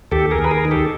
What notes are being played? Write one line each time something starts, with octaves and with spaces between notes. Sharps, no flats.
D#2 G4 A4
G#4 A#4
D#2
B4
G#4 A#4
D#3
G4 A4